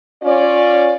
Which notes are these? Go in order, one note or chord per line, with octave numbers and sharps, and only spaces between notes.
C#4 F4 D5